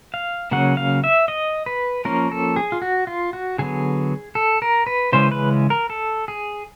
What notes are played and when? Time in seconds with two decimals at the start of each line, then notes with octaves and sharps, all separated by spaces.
0.14 F5
0.51 C#3 F#3 A#3 C#4 F#5
0.77 F5
1.04 E5
1.28 D#5
1.66 B4
2.05 F3 A#3 C#4 A#4
2.32 A4
2.56 G#4
2.72 F4
2.82 F#4
3.07 F4
3.33 F#4
3.58 D3 F#3 B3 G#4
4.35 A4
4.62 A#4
4.87 B4
5.12 C#3 E3 G#3 C#4 C5
5.32 B4
5.70 A#4
5.90 A4
6.28 G#4